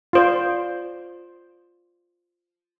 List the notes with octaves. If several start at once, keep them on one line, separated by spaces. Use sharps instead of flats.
F4 C5 D5